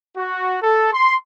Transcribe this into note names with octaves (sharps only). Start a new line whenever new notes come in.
F#4
A4
C6